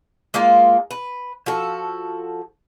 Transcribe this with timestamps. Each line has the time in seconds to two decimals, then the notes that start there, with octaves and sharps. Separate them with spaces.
0.34 G#3 A#3 F4 A#4
0.91 B4
1.46 F3 F#4 A4